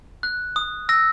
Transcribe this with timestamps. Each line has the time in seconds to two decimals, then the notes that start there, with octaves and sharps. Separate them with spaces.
0.23 F#6
0.56 D#6
0.89 E6 A#6